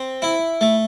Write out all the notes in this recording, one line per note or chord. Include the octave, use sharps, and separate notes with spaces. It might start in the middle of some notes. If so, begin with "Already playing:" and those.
Already playing: C4
E4
A3